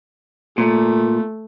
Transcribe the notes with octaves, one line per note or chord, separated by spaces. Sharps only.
A#2 A3